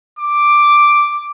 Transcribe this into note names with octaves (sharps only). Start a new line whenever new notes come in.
D6